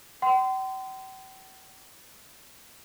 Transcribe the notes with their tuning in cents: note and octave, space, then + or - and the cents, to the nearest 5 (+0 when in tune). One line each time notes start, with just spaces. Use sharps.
G5 -45 C6 -30